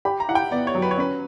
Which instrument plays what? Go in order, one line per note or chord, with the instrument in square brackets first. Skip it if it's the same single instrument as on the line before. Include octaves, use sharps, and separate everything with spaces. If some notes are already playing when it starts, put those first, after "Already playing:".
[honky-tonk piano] G4 [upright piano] B5
[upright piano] A#5
[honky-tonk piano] E4 [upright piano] F#5
[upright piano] G5
[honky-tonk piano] B3 [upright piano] D5
[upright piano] C#5
[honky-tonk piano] F#3
[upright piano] B4
C#5
[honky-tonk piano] C#4 [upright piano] B4